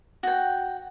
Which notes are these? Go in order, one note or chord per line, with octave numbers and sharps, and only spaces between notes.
F#4 G5